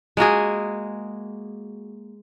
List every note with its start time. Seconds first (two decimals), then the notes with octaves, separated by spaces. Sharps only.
0.17 G#3 A#3 F#4 G#4